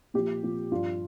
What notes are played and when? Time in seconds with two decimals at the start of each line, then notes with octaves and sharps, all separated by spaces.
0.14 A#2 F3 G4
0.43 A#2 F3
0.71 G2 F3 F4